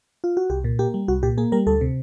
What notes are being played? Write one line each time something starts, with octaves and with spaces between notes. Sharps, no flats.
F4
F#4
C2 G4
A#2
A#3 G4
G3
C2 F#4
A#2 G4
A#3 G#4
G3 A#4
D2 A4
C3